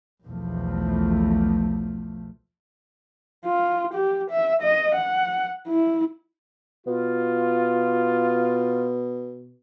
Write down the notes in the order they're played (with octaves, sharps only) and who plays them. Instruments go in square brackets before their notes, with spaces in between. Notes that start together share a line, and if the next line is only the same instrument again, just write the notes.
[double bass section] B1 E2 F3 A3
[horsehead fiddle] F4
G4
E5
D#5
F#5
E4
[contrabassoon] B2 [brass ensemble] F4